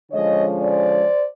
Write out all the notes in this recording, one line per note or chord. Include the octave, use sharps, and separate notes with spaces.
D3 F3 G#3 C#4 C#5 D#5
C5 D5